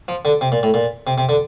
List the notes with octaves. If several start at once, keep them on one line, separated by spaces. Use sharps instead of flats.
F3
D3
C3
A#2
A2
A#2
C3
C3
D3